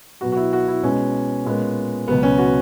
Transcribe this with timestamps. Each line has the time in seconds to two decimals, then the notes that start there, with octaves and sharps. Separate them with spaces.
0.21 B2 F#3 B3 F#4
0.32 F#4
0.36 E4
0.53 F#4
0.68 E4
0.83 B2 G#3 B3 C#4
1.46 A#2 G#3 B3
2.08 C#2 B2 F#3 B3
2.23 C#4
2.38 F#4